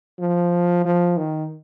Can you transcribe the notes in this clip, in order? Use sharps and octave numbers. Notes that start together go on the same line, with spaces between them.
F3
F3
D#3